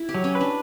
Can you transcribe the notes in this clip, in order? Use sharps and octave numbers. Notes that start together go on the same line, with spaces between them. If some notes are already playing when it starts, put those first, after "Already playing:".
Already playing: E4
G4
F#3
C#4
B4
D4